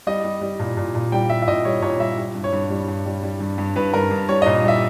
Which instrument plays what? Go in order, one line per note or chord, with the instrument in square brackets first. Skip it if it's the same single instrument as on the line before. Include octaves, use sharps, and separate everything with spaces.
[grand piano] G3 D#5
G3
G3
A#2
A#2
A#2
G3 G5
G3 E5
E5
A#2 D#5
G3 C#5
A#2 C#5
G3 E5
G3
G2
C#5
G2
G3
G2
G3
G3
G2
G2
G2 B4
G2 A#4
G2
G3 C#5
A#2 D#5
G3 E5